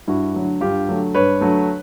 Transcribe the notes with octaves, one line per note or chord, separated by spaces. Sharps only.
G2 E4 F#4
D3 F#3 A3
G2 F4 G4
D3 F#3 A3
G2 B4 C#5
D3 F#3 A3